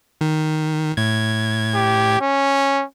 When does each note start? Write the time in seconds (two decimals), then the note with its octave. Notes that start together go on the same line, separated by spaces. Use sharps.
0.21 D#3
0.97 A2 G#6
1.75 G4
2.21 C#4